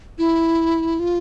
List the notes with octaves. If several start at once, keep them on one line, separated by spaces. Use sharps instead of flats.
E4
F4